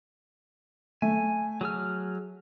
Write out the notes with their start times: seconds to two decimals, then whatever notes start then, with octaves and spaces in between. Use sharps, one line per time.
1.02 A3 G#5
1.61 F#3 G#4 F6